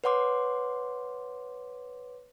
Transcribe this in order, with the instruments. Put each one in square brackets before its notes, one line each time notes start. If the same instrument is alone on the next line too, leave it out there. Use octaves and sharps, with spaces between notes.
[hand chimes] B4 C#5 F#5 C6 D6